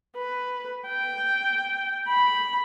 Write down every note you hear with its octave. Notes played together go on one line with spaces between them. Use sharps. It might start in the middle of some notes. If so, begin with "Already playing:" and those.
B4
G5
B5